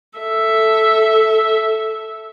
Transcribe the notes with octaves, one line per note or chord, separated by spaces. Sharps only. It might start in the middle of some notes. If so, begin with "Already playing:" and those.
A4 E5